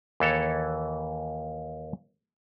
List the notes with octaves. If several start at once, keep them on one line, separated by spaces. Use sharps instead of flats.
D#2 E3 A4 C#5